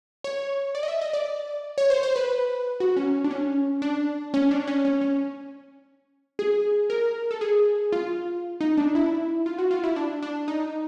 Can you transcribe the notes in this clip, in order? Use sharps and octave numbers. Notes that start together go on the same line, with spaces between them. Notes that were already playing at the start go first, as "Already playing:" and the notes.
C#5
D5
D#5
E5
D#5
D5
C#5
C5
C5
B4
F#4
C#4
D4
C#4
D4
C#4
D4
C#4
C#4
C#4
G#4
A#4
A4
G#4
F4
D#4
D4
E4
F4
F#4
F4
E4
D4
D4
D#4